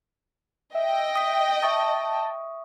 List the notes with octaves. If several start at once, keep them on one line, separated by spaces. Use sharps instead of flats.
D#5 E5 G5
D#6 B6
E5 A5 C#6 D#6